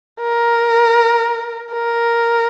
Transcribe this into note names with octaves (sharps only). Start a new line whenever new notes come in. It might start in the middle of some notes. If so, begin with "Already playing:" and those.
A#4
A#4